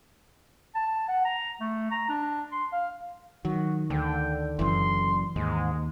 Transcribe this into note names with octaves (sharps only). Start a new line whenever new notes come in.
A5
F#5
A#5
A3
A#5
D4
C6
F5
D#3 F#3 F#4
D2 D3 G5
F#1 F#2 E3 C6
D#2 G#2 G#3